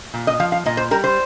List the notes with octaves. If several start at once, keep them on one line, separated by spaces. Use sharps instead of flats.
A#2
D#5
F3 F5
F5
A#2 D#5
C5
G3 A#4
C5